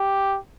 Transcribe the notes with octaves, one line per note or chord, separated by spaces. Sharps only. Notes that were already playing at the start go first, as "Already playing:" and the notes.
Already playing: G4